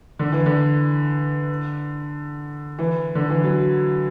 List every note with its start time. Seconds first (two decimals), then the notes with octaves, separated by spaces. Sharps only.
0.19 D3
0.32 E3
0.46 D3
2.79 E3
3.15 D3
3.30 E3
3.44 F#3